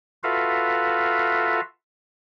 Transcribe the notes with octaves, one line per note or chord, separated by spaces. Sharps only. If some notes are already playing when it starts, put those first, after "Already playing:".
F4 F#4 A4 B4 E5 F5